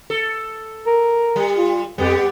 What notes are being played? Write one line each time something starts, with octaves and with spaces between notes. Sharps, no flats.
A4
A#4
G3
F4
F2 G3 B3 G4